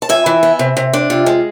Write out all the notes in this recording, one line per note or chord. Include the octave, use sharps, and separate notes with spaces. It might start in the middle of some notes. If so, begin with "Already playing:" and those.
A5
F2 E5 G#5
E3
B3
C3
C3
D4
C3 F4
G#3